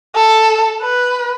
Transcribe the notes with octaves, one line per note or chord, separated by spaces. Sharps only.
A4
B4